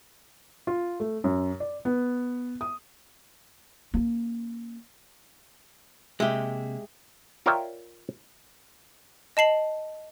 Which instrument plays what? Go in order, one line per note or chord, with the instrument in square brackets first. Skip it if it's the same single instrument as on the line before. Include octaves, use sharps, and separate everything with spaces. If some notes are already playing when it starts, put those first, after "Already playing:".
[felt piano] F4
A3
F#2
D5
B3
D#6
[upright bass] A#3 C#4
[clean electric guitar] C3 A#3 [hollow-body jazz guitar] G#3 G4 [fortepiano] E5
[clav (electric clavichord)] F4 A#4 C#5 D5 E5 G5
[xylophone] D#5 A5 C7 F#7